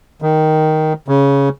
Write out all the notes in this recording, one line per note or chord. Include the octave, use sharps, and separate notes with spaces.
D#3
C#3